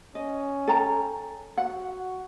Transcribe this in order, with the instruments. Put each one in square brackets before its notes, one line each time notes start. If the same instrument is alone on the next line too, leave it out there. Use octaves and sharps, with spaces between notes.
[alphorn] C#4 [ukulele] D#5
[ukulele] A4 G5 A#5
[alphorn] F#4 [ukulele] F#5